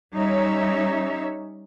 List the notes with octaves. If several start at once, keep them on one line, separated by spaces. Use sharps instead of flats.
G3 C#4 D#4 C#5 E5